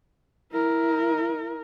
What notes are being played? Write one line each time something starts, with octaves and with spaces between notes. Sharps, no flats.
E4 A#4